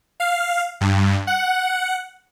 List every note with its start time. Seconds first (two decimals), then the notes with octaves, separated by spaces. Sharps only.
0.20 F5
0.81 G2
1.27 F#5